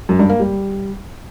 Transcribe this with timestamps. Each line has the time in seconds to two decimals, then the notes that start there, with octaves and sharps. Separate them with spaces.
0.09 F#2
0.19 G2
0.29 A#3
0.40 G3